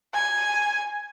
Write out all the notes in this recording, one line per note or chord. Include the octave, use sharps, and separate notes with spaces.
G#5